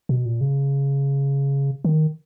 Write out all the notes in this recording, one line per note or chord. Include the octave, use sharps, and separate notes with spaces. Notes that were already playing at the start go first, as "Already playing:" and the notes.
B2
A#2
C#3
D#3